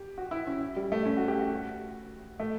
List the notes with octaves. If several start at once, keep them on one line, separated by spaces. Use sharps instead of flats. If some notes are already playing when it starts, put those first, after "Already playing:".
Already playing: G4
F#4
E4
C#4
G3
A3
C#4
F#4
G4
F#4
A3